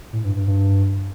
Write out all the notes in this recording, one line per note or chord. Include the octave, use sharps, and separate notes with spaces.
A2
G2
G2
G2